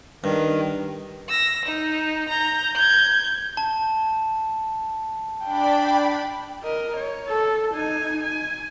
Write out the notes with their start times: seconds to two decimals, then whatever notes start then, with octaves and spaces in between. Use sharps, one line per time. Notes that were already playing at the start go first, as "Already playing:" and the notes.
0.24 G2 D#3
1.29 E6 A#6
1.66 D#4
2.29 A#5 G6
2.75 G6 G#6
3.57 A5
5.45 D4 D5 G5 B5
6.64 A#4 D#5
6.96 C#5
7.28 A4
7.73 D#4 G#5
8.23 G#5